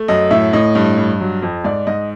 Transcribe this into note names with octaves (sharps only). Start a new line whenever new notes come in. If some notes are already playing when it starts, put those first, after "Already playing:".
Already playing: A3
F#2 D#5
A2 E5
A2 D#5
G2
G2
F#3
F2
G#2 D5
G#2 D#5